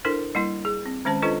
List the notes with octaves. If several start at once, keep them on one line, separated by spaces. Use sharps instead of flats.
D4 E4 A4 A#4 C5
G3 A#3 E4
G#4
C4
D#3 G#3 C#4 C5 A5
D4 F4 A4 B4 C5 D#5